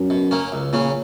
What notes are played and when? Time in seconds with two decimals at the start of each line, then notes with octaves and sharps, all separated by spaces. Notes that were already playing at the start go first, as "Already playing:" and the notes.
Already playing: F#2
0.10 B2
0.31 F#3 A#3 C#4
0.52 C#2
0.73 A#2 C#3 F#3 C#4